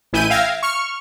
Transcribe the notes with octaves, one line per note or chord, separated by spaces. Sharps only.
A1 E4 G#5 G6 D#7
E5 F5 G5 G#6 A#6
C#6 F6